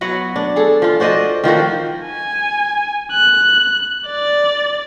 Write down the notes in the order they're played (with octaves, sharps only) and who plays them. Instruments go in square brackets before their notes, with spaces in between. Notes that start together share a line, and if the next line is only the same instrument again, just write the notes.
[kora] F#3 B3 F#4 F#5
D4
G#4 A4
F3 F4
F#4 C5 D5 D#5
D#3 F3 C4 F#4
[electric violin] G#5
F#6
D5